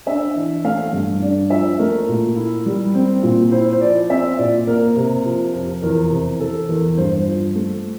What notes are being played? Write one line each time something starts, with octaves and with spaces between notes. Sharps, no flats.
D4 E5
E3
A3 F5
G2
D4
F3 E5
A3 A#4
A#2
E4
G3
C4
A#2
E4 C5
C5
F3 D5
C4 E5
A#2 D5
A#3 A#4
C3
F3
F2
E2 A#4
C3
E3 A4
E2 A#4
G2 C5
F3
A3